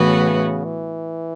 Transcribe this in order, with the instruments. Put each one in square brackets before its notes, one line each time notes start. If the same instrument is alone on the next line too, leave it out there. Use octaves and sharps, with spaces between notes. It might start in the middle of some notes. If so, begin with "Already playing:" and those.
Already playing: [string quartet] A2 E3 B3 F#4 B4 [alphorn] C#3
[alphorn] E3